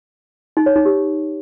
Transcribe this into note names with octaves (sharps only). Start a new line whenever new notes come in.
D#4
C#5
D#4
G4